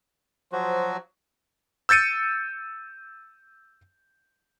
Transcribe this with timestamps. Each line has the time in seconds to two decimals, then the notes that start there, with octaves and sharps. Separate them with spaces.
0.52 F3 F#3 F#4 C5
1.89 E6 G6 A6 C#7 D#7